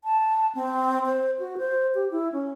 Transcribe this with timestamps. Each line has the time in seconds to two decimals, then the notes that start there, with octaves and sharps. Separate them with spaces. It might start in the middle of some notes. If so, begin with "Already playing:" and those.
0.04 A5
0.55 C4
1.06 C5
1.39 F#4
1.58 C5
1.95 G4
2.11 E4
2.33 C#4